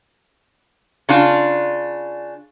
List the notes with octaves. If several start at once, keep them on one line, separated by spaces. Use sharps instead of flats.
C#3 D4 F4